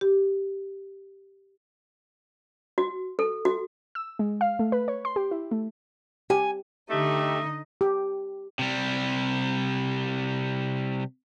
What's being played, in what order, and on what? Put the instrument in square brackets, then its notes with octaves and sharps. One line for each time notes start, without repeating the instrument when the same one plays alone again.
[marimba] G4
[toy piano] F#4
A4
F#4
[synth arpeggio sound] E6
G#3
F5
A3
B4
C#5
C6
G4
E4
A3
[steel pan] G4 [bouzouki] G#5
[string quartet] D3 D#4 [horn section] A3 [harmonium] G4 [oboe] D#5
[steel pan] G4
[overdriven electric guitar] C3 G3